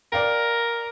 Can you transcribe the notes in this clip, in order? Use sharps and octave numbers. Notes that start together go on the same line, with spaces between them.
A#4 D5 F5 G5